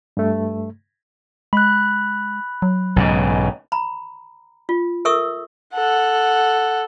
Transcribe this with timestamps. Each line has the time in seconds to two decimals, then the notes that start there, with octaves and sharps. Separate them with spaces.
0.17 G2 A3
1.53 G#3 B5 F#6
2.62 F#3
2.96 B1 G#2 C#3
3.72 A#5 B5
4.69 F4
5.05 A4 A#4 E5 C#6 D#6 E6
5.74 A4 F#5